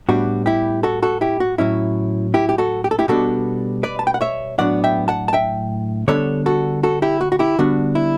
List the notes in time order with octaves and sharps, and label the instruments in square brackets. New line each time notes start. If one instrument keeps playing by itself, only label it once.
[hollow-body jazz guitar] A2 G3 B3 D4 F#4
E4 G4
F#4 A4
F#4 A4
E4 G4
F#4
A2 F#3 C#4 E4
E4 G4
G4
F#4 A4
G4
A4
E4 G4
B2 G3 B3 D4 F#4 A4
B4 D5
A5
G5
F#5
C#5 E5
A2 F#3 B3 D4 D5 F#5
E5 G5
F#5 A5
A5
E5 G5
D3 G3 B3 D4 A4 C#5
F#4 A4
F#4 A4
E4 G4
F#4
F#4
E4 G4
D3 G3 B3 D4 F#4
E4